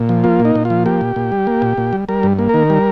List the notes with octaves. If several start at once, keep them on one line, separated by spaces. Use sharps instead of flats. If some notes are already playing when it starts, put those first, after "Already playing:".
Already playing: A#2
F3
A#3 F4
A#2
D#4
A#2
F4
F3
A#3 G4
A#2
A#2
G3
A#3
A#2
A#2
G3
G3 A#4
G2
A#3
D#3 A#4
G3